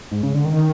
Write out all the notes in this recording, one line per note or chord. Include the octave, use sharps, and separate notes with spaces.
G#2
C#3
D3
D#3